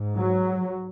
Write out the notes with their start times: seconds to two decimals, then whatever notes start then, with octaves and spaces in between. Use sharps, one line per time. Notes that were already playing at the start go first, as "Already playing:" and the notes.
Already playing: G#2
0.17 F#3